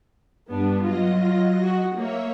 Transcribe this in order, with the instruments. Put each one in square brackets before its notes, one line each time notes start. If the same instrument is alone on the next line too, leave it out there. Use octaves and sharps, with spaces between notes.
[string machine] G2 [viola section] B3 D4
[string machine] F#3 D#5 A#6 [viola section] F4
[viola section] F4
F#4
[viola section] A#3 [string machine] C#5 E5